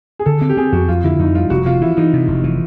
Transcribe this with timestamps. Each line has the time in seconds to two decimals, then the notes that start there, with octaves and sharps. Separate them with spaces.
0.19 G#4
0.26 D3 A4
0.42 C4
0.49 G4
0.57 C4 G#4
0.72 F2 F#4
0.88 F2 F4
1.04 D3 E4
1.19 F2 D#4
1.35 G3 F4
1.50 F1 F#4
1.66 C3 F4
1.81 E3 E4
1.97 E3 D#4
2.13 C3
2.28 F1
2.44 E3